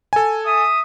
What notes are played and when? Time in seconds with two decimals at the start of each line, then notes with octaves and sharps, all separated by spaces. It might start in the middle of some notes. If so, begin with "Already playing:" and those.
0.13 A4 G#5
0.45 E5 D#6